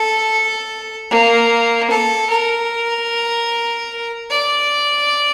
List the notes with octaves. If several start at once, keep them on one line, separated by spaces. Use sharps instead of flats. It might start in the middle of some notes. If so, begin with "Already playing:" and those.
Already playing: A4
A#3
A4
A#4
D5